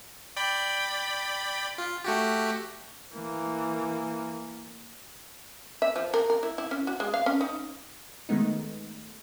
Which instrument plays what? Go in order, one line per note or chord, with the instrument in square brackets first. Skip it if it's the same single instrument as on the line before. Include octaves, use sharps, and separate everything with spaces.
[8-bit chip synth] D5 G5 B5
F4
A3 F#4 G4
[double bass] E3 A#3
[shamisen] E5
F3
A#4
A#4
E4
E4
C#4
F#4
G#3
F5
C#4
D#4
[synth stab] D#3 G#3 A3 B3 D#4